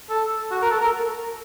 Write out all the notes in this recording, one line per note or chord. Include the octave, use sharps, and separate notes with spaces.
A4
F#4
A#4
A4
A#4